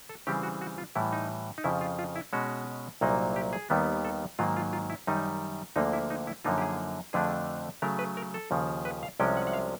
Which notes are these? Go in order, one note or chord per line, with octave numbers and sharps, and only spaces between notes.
A4
C#3 E3 G3 C4 G4
F#4
F#4
F4
A2 E3 G3 E4
D#4
D#4
F2 C#3 F3 E4
F4
F4
E4
B2 G#3 C#4 F#4
C2 A#2 F#3 A#3 D#4
G4
G#4
D#2 D#3 G3 B3
A4
G#2 D#3 F#3 A#3 F4
F4
F4
E4
F#2 D#3 G3 D#4
D2 D3 F3 A#3 D#4
E4
D#4
E4
F#2 D3 F3 A#3 D#4 F4
G4
G#4
F2 D3 F3 A3 D4 G#4
C#3 F#3 A3 A#4
B4
A#4
A4
D#2 C#3 F3
B4
F5
C2 C3 F3 G#3 C#4 G5
F#5
F#5
F5